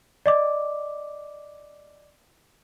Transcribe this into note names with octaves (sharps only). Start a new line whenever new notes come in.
D5 D#5 D6